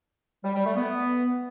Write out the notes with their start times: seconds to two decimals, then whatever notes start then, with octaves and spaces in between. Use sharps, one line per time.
0.44 G3
0.55 G3
0.65 A3
0.76 B3